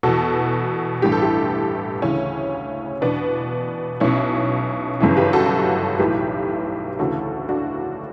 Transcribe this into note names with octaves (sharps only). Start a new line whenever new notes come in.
E2 B2 F#4 A4
A1 G2 E3 G4
A4
E4 G4
D2 C#3 E3 C#4 E4
E2 B2 B3 D4
B1 B2 C#4 E4
G1 F#2 C#3 E3
G4 B4
F#4 A4
B1 A2 E3 G4 B4
D2 C#3 E3 F#4 A4
D4 F#4